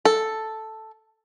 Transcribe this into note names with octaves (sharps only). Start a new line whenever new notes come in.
A4